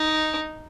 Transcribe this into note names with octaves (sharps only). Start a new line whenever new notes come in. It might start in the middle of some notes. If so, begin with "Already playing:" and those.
Already playing: D#4